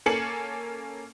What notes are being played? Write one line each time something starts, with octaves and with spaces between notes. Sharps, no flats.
A#3 C#4 A4 G#5 C#7 F#7